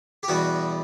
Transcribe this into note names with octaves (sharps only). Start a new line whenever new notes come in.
G4
E2 B2 G3 F#4